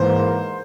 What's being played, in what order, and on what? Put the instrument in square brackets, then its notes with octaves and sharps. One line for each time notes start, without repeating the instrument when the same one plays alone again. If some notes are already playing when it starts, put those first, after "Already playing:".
Already playing: [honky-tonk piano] G#2 E3 A#3 [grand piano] C5